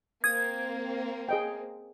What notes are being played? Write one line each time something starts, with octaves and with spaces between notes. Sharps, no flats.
A#3 C4 D#6 G#6
G#4 D#5 G5